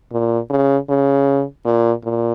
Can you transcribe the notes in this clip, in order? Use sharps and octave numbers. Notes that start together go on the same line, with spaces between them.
A#2
C#3
C#3
A#2
A#2